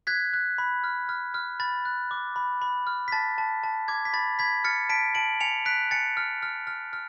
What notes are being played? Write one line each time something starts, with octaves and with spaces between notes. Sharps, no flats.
F#6 G#6 B6
F#6
B5
F6
F6
F6
B5 A6
F#6
D6
B5
B5
F6
B6
A5 A6
A5
A5
D6 G#6
B6
B5 A6
B5 G#6 B6
F6 A6 C#7
A5 B6 D7
A5 D7 F#7
G#5 C#7 F7
F#6 B6 D7
G#5 A6 C#7
F6
F6
F6
F6